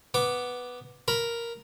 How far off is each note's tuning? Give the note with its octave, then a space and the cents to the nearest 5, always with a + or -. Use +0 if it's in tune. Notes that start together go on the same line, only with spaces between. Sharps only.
B3 +0 D6 +0
A#4 +0 B5 +0